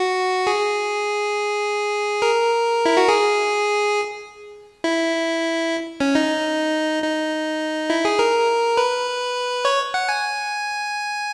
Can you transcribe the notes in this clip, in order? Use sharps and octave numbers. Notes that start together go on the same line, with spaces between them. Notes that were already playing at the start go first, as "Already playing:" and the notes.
Already playing: F#4
G#4
A#4
E4
F#4
G#4
E4
C#4
D#4
D#4
E4
G#4
A#4
B4
C#5
F#5
G#5